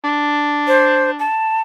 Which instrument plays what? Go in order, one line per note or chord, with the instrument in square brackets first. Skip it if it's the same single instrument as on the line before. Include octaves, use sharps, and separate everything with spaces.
[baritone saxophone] D4
[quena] C5
A5